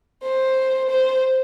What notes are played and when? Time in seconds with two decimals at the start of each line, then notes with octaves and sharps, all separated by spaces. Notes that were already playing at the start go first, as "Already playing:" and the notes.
0.23 C5
0.90 C5